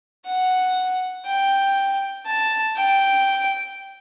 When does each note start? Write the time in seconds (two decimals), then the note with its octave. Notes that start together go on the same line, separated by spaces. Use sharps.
0.26 F#5
1.26 G5
2.26 A5
2.76 G5